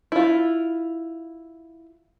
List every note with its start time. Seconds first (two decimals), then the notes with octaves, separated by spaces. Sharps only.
0.12 E4 F4